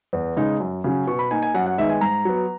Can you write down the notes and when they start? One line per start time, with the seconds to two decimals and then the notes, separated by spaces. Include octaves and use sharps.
0.13 E2
0.37 C#3 G#3 D#4
0.60 F#2
0.84 C#3 F#3 C#4
1.07 B2 C#6
1.19 B5
1.31 A#3 D#4 G#5
1.43 G#5
1.54 F#2 F#5
1.66 F#5
1.78 D#3 G#3 B3 D#4 E5
1.90 G#5
2.01 G#2 A#5
2.25 F#3 B3